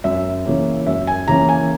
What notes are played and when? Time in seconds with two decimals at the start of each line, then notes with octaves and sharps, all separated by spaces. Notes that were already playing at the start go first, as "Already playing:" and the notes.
0.04 F#2 E5
0.45 C#3 E3 A#3 C#4
0.87 F#2 E5
1.07 G#5
1.28 C#3 E3 A#3 C#4 A#5
1.49 G#5